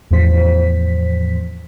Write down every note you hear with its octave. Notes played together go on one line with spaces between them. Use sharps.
E2 A2 F3 C5 B6